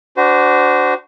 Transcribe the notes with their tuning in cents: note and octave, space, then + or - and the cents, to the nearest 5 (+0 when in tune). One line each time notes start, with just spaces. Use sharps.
D4 +0 F#4 +15 C5 -30